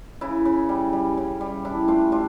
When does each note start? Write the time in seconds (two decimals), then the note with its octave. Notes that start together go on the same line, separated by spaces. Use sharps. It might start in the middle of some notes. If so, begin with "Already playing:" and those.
0.21 C#3 E4
0.45 C#3
0.69 G3
0.93 G3
1.17 C#3
1.41 G3
1.65 D4 E4
1.88 A3 D4 F4
2.12 A3 D4 F4